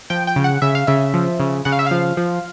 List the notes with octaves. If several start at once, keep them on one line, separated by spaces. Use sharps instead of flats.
F3 G5
G5
C#3
F#5
C#3 E5
F5
C#3 E5
F3
C#3
C#3 F#5
F5
E5
F3 F5
F3